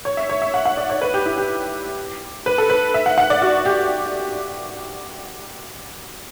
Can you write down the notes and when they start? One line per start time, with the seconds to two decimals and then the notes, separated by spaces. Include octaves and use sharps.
0.05 C#5
0.17 E5
0.30 C#5
0.42 E5
0.54 F#5
0.66 F#5
0.77 D5
0.90 C#5
1.01 B4
1.14 G4
1.26 E4
1.38 G4
2.46 B4
2.58 A4
2.70 B4
2.94 E5
3.06 F#5
3.18 F#5
3.30 D5
3.42 F#4
3.65 G4